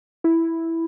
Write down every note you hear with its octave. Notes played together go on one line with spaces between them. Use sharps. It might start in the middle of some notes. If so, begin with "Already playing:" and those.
E4